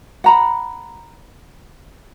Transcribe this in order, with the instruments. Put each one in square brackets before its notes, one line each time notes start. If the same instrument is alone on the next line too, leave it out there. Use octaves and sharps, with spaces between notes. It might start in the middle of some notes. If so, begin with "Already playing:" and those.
[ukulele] F#5 A#5 B5